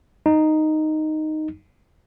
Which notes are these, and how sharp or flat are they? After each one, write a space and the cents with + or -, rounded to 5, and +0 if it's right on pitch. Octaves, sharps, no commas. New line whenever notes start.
D#4 -5